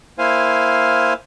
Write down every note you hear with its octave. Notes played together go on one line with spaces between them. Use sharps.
A#3 E4 C5 F5 G#5